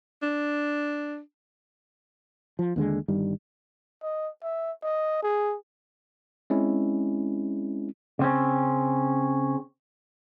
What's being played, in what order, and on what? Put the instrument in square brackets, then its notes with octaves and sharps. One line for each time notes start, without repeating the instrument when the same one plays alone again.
[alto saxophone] D4
[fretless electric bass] F3
D#2 D3 G#3
G1 G2 D#3 G3
[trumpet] D#5
E5
D#5
G#4
[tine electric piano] G#3 C4 C#4 E4
[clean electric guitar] C#3 C4 C#4